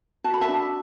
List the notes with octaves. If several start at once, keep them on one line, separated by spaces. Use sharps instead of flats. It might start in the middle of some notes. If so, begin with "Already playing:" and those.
F#4 A5
B5
E5 A5
D4